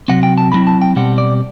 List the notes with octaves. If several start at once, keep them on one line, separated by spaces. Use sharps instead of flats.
C3 F#3 C4 F#5
G5
A5
D3 F#3 C4 E4 B5
A5
G5
B2 G3 C4 F#5
D5